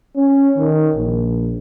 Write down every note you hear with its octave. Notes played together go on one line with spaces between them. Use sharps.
C#4
D#3
A#1